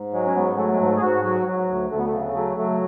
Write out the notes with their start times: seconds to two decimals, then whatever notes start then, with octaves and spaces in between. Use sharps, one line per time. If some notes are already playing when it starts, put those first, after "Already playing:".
Already playing: G#2
0.13 F#3 G#3
0.27 C#4
0.35 G#2 B3
0.57 F#3 A3
0.74 G#3
0.80 G#2 A3
0.97 G#4
1.02 G#2 F#4
1.24 F#3 F#4
1.46 F#3
1.68 D2
1.91 D2 A3
1.98 B3
2.06 A3
2.13 C#3
2.35 F#3 A3
2.57 F#3 A3